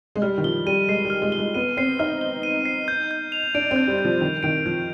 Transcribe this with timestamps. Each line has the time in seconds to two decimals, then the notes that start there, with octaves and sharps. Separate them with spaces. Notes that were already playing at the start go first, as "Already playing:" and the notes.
0.16 G#3
0.22 G3 F6
0.38 D#3
0.44 F3 G7
0.67 G3 D#7
0.88 G#3 C7
1.05 G3 F6
1.22 G#3
1.32 G7
1.39 G#3
1.55 B3 D#7
1.77 C4 C7
1.99 D#4 F6
2.21 G7
2.43 D#7
2.66 C7
2.88 G6
3.11 G6
3.32 F7
3.55 D4 D7
3.71 C4
3.76 G6
3.88 G3
3.98 G6
4.05 F3
4.21 D#3 F7
4.43 D#3 D7
4.65 F3 G6